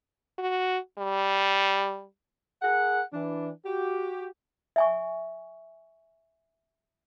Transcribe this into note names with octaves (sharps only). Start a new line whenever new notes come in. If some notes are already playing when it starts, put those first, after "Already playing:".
F#4
G3
G#4 A#4 F#5
E3 D4
F#4 G4
E5 G#5 C#6